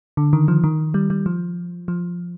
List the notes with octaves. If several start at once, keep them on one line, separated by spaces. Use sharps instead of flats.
D3
D#3
F3
D#3
G3
G3
F3
F3